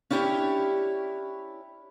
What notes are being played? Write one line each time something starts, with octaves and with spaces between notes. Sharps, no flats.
C#4 D4 E4 G4 B4 C#5